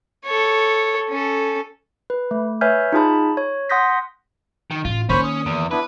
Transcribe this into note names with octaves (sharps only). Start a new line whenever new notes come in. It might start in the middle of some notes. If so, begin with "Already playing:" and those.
A4 C#5
C#4 A4
B4
A3
B4 C#5 E5 G#5 F6 G6
D#4 F4 G#4 A5 B5
C#5
F#5 C6 D#6 G6 A#6 B6
D#3
A1 F4
D#3 A#3 C#4 C5 B5 C#6
D#6
E2
B3 D4 E4 B4